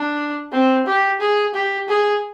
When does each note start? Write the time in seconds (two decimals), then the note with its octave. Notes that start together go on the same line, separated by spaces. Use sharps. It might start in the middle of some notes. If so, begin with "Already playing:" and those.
Already playing: D4
0.52 C4
0.87 G4
1.21 G#4
1.54 G4
1.88 G#4